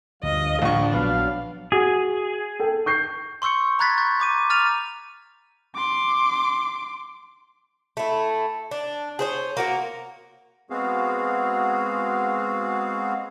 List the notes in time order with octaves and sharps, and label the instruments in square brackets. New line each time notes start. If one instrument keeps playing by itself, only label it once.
[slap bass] D2 [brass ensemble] G2 F3 F5 [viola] D#5
[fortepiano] A#1 C#6 [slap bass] A2 D3 E3 [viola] D4
[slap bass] A#1 [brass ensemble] F#3 F5 [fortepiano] B3
[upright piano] F#4 [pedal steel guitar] G#4
[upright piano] A4 G5
C#6 G6 C7
[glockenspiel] C6 C#6 E6 G6 C#7
A#5 B5 F#6 G#6 A6 B6
C#6 G6
A#5 D6 D#7
A#5 D6 F6 A6 D#7 F7
[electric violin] C6 D6
[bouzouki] A3 E4
D4
G#4 C5 C#5
A#3 F#4 A#4
[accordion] G#3 B3 C4 F#4 G#4 F5